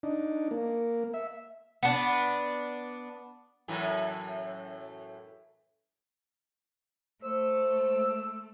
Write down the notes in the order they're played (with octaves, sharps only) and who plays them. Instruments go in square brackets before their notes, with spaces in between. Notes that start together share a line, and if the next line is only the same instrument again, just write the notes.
[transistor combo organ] D4 D#4
A#3
E5
[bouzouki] B3 D4
[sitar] F#2 A2 E3
[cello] A3 [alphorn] C5 [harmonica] E6